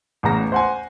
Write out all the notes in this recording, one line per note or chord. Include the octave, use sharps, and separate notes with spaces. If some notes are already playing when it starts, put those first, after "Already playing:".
A1 C#3 B3 A#5 A#6
C5 F#5 G#5